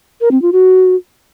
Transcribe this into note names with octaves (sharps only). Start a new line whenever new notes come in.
A#4
C4
F4
F#4